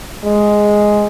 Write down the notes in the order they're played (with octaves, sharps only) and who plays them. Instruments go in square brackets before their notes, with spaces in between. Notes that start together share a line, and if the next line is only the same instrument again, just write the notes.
[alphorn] G#3